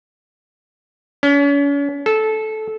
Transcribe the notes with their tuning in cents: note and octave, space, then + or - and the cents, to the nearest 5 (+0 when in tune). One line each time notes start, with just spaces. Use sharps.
C#4 +40
A4 -15